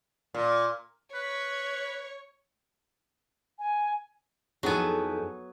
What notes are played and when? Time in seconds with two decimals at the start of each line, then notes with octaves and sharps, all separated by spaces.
0.34 A#2
1.14 B4 C#5
3.59 G#5
4.63 F2 F#3 B3 D#4 E4 G#4 A4